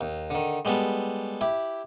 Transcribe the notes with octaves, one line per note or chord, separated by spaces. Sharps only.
D#2
D3 D#3
G3 G#3 B3 G4 A4
E4 G4